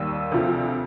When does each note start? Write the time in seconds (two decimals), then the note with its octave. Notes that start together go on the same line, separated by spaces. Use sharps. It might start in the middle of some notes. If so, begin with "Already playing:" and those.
Already playing: D#2 D#3 G3 E6
0.32 D2 C3 F3